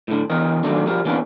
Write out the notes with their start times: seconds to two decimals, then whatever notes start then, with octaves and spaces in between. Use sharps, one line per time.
0.08 A2 D3
0.30 E2 E3 A#4 D#5
0.63 D#3 F#3 A3 A#3 D4
0.86 F3 G3 A#4
1.05 E3 A#3 B3 C#4 D4